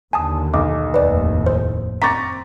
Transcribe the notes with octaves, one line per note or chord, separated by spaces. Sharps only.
D#2 D3 G#5 A5 D#6
B1 D6
F1 D#2 A2 B4 D5
C5
C4 A#5 C#6 D6 A6 B6